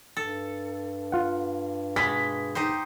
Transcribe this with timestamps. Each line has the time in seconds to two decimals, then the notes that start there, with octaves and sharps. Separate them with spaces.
0.17 G2 A4
1.12 F4 F#5
1.96 B2 G#3 B6
2.55 D#4 G4 C5